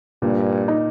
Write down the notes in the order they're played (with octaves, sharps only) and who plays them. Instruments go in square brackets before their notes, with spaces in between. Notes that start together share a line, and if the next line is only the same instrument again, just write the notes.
[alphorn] G2 [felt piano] A#2
[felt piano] D#4